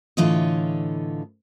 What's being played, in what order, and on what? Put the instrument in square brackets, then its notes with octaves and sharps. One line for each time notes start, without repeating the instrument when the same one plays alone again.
[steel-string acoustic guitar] A2 D3 E3 F4 C#5 D#5